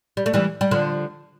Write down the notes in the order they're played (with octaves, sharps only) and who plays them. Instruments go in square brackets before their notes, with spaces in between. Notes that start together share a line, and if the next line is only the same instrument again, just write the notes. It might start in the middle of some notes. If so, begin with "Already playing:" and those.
[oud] G3
A3
E3 G3
G3
D3 F3